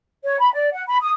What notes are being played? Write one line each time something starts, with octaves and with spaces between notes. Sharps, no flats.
C#5
B5
D5
F#5
B5
D#6